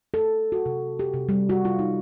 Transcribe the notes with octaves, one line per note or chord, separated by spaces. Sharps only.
A4
F#4
C3
G4
C3
G3
F#4
F4
D#4